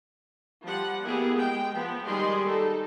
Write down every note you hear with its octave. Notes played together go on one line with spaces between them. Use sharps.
F3 G3 F#5
A#3 B3 E4 G4 G#4
G#3 G5
F3 B3
D#3 G3 G#3 G#4 C6
D#4 A4